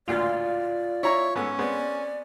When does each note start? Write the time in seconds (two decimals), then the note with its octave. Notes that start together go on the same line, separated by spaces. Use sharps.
0.08 A1 D2 A#2 F4 D5
1.03 E4 C#5 A#5 C#6
1.36 G#2 B3 C#4 A4
1.58 G#3 B3 C4 D5